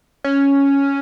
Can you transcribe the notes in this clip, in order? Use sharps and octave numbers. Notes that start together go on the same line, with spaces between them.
C#4